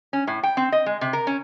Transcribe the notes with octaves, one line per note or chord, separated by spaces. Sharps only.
C#4
A2
G5
C4
D#5
G#3
C3
A#4
C#4